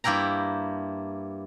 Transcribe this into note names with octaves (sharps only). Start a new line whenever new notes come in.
G2 A#3 E4 G5 A#5